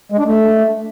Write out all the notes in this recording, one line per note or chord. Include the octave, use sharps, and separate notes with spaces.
G#3
D4
A3